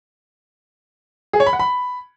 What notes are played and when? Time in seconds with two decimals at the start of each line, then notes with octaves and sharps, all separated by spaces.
1.33 G#4
1.40 C#5
1.46 B5
1.53 F#5
1.59 B5